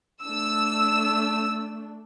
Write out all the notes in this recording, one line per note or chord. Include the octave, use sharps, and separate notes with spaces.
A3 D4 E6